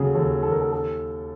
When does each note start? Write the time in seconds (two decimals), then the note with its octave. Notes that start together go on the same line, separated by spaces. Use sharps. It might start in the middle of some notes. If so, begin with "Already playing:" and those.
Already playing: D#2 C#3 F#3 G#4 A4
0.15 D#2 A4
0.43 D#2 A4
0.52 A#4
0.61 A4
0.72 A4